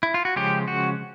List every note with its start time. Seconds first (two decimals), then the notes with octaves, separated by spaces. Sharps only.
0.03 E4
0.14 F4
0.25 F#4
0.36 C#3 F3 G#3 C#4 G4
0.68 F#4